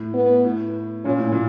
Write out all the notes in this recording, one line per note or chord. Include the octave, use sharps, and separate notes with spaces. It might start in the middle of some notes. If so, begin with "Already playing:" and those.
Already playing: A2
B3
A2
A#2 C#4
A2
A#2